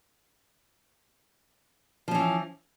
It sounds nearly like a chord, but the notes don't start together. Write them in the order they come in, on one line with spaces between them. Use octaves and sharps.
F3 C#4 E3